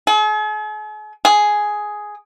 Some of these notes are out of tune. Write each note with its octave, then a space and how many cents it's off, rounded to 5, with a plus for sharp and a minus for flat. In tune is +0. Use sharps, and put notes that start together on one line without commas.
G#4 +45
G#4 +5